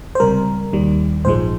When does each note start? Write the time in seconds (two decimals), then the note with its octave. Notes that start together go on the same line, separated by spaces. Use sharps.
0.15 C5
0.20 C#2 C3 G3 A#4
0.73 D#2 D#3 G3
1.25 A#1 G#2 F3 G#3 C5